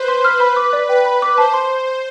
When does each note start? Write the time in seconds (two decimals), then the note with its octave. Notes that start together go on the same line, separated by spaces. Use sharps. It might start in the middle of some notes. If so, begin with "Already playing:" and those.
Already playing: B4 C5
0.08 C6
0.24 F6
0.40 B4 B5
0.56 D6
0.73 D5
0.89 B4 G5
1.05 B5
1.22 D6
1.38 C5 A5
1.54 C6